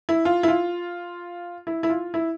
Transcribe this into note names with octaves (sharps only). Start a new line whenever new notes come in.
E4
F4
E4
F4
E4
E4
F4
E4